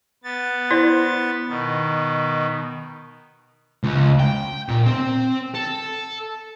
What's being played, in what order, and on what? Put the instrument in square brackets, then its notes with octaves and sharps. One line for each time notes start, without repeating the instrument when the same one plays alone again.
[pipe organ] B3 A6
[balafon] E4 C5 D5
[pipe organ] B2 D#3
[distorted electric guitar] C#2
G5
A#2
C4
A4